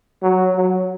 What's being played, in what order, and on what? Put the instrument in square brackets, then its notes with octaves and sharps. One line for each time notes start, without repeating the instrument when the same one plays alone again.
[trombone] F#3
F#3